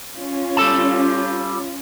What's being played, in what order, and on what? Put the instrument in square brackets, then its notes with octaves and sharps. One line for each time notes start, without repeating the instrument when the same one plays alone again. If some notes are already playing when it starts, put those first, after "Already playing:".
[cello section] C#4 F4
[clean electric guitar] G3 A4 A5